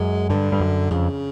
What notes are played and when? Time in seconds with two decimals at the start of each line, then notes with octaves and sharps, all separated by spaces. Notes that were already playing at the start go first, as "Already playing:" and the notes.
Already playing: F#2 G#3
0.29 G2 D3
0.52 G2
0.60 F#2
0.91 F2 C#3